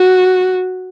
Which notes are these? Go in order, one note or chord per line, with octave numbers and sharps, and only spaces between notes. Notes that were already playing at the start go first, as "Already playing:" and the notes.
Already playing: F#4